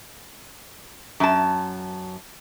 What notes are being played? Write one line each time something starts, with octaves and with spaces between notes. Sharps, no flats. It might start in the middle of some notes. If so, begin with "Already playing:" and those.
F#2 A5